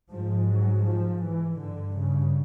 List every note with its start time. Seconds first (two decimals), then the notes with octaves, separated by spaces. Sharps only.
0.12 G#2 F3
0.48 F#3
0.85 F3
1.22 E3
1.58 G2 D3
1.95 C#3